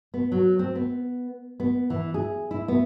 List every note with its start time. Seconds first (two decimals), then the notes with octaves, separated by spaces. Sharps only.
0.14 B3
0.32 F#3
0.59 C4
0.75 B3
1.60 B3
1.90 E3
2.14 G#4
2.51 E4
2.68 B3